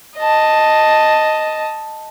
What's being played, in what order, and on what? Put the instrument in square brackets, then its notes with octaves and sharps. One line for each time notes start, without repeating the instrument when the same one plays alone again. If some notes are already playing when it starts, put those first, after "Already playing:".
[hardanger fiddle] D#5 A5